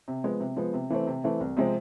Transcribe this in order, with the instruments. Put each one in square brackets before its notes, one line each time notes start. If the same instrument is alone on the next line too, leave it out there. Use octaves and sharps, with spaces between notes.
[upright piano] C3
F3 G#3 B3
C3
F3 G#3 B3
C3
E3 A3 C4
C3
E3 A3 C4
C2
C3 F3 G#3 C4